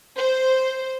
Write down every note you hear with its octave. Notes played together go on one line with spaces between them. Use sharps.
C5